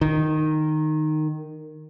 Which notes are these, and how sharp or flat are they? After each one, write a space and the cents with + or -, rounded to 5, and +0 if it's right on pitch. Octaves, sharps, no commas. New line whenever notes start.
D#3 -10